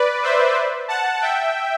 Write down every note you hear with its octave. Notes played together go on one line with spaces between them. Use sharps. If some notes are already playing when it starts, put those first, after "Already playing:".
Already playing: B4 D5
C5 E5
F#5 A5
E5 G5